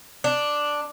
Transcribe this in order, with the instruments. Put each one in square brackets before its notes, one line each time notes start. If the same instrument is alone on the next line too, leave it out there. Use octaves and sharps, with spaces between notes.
[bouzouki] D4